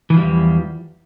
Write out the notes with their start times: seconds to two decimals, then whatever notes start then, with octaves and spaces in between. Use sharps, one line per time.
0.10 E3
0.14 F3
0.18 G3
0.21 E2